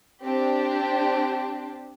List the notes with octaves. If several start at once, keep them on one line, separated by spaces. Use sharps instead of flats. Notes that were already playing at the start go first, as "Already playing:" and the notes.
C4 D4 G4